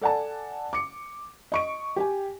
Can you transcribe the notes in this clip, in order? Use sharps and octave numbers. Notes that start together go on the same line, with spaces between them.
A4 D5 F#5 G#5 A5
D6 C#7
D#5 C#6 D7
G4 G5 G#5